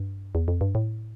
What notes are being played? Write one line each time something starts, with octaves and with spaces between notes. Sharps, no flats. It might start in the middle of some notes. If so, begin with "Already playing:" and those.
Already playing: G2
E2
F2
G2
A2